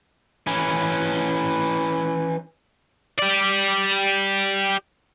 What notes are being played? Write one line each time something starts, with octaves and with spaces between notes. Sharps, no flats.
E3 C#4
G4 D5